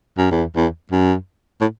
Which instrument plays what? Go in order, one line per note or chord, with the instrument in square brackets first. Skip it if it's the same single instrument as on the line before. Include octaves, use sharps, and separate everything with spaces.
[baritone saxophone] F#2
E2
E2
F#2
A2